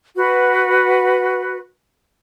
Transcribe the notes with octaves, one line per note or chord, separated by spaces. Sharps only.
F#4 B4